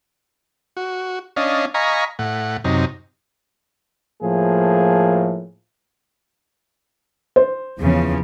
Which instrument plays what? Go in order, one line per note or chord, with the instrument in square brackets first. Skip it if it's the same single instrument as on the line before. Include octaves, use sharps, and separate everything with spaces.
[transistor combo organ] F#4
C#4 D4 D#5 F5
D#5 F5 G#5 A#5 B5 C#6
A2 F#5
F#2 C3 D#4
[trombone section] A2 F3 A#3 G#4
[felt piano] C5
[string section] E2 C#3 F3